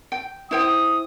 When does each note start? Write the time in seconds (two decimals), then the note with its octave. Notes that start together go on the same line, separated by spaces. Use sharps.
0.12 G5
0.51 E4 C5 G5 D#6